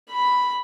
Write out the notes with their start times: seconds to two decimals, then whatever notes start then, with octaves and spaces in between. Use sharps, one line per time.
0.11 B5